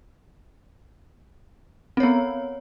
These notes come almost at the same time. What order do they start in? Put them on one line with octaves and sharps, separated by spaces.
C4 C#5 B3